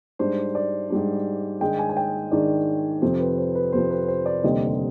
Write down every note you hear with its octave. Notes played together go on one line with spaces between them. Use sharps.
G#2 G3 D4 C5
D5
G#2 G3 D4
G#2 D#3 G#3 D4 G5
G#5
G#5
G5
G#2 D#3 G#3 D4 D5
F2 C3 F3 C5
B4
C5
B4
F2 C3 F3 C5
B4
C5
D5
F1 D#2 D3 G3 C4 D#5